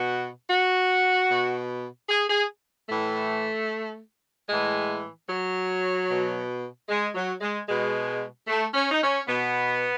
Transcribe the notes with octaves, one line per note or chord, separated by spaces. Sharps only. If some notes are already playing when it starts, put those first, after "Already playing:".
Already playing: B2 F#4
F#4
B2
G#4
G#4
A2 E3 A3
A2 E3 G#3
F#3
B2
G#3
F#3
G#3
B2 G#3
A3
C#4
D#4
C#4
B2 B3